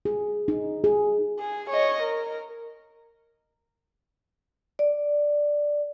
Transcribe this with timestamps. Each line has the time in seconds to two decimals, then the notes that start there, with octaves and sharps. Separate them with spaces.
0.05 G#4
0.48 D#4
0.84 G#4
1.39 G#4
1.70 C#5 D#5
2.03 A#4
4.79 D5